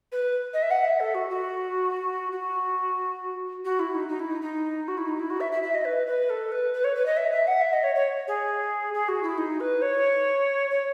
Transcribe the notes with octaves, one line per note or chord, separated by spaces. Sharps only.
B4
D#5
E5
F#5
E5
A4
F#4
F#4
F#4
F#4
E4
D#4
D#4
E4
D#4
D#4
F#4
E4
D#4
E4
F#4
E5
E5
E5
D#5
B4
B4
A4
B4
B4
C#5
B4
D#5
E5
E5
F#5
E5
D#5
C#5
C#5
G#4
G#4
F#4
E4
D#4
B4
C#5
C#5